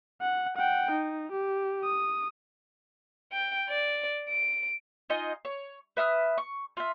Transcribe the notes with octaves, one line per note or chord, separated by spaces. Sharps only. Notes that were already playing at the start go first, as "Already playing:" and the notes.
F#5
F#5 G5
D#4
G4
D#6
G5
D5
D7
D#4 F4 D#5 G#5
C#5
B4 E5 D#6 F6
C#6
F4 E5